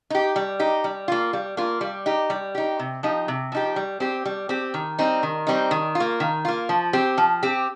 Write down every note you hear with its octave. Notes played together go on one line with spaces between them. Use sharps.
D#4 G4
G3
D#4 G4
G3
A#3 F4
G3
A#3 F4
G3
D#4 G4
G3
D#4 G4
C3
F3 D#4 G4
C3
F3 D#4 G4
G3
C4 G4
G3
C4 G4
D#3
G3 C4 D#4
D#3
G3 C4 D#4
D#3
F4
A#3
D#3
A#3 F4
F3
C4 G4
F3
C4 G4